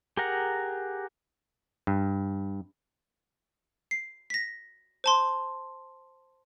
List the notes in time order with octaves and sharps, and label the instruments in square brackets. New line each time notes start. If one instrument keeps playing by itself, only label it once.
[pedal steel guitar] G4 G#4 A#4 F#5 A#5
[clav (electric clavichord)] G2
[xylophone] C7
A#6 B6
C5 A5 C6